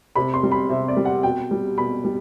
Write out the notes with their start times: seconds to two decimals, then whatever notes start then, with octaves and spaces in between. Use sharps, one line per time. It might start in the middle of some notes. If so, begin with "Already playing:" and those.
0.16 C3 B5
0.34 C6
0.43 G3
0.52 B5
0.69 C3 E5
0.88 D5
0.97 G3
1.05 F#5
1.23 B2 G5
1.51 G3
1.78 B2 B5
2.04 G3